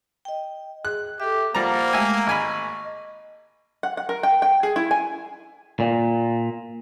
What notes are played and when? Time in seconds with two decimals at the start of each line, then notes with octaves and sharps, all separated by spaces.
0.25 D#5 G5
0.85 G#4 F#6
1.20 G4 A4 E5
1.55 F3 G3 A#3 C5 F#5 A#5
1.93 G#3 A3 G4 E5 G#5
2.27 G#1 D#5 G#5 B5 C#6
3.83 F#5
3.97 F#5
4.09 A#4
4.23 G5
4.42 G5
4.63 G#4
4.76 E4
4.91 G#5
5.80 A#2